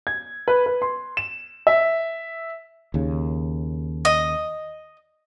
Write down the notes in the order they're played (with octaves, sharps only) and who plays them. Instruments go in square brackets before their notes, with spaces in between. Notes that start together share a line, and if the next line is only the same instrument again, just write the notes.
[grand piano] G#6
B4
B4
C6
E7
E5
[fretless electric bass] D#2 C#3
[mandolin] D#5